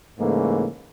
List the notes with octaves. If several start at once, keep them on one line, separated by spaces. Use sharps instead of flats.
G#2 C#3 E3 A3 A#3